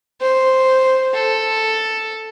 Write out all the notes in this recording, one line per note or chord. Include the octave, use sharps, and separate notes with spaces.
C5
A4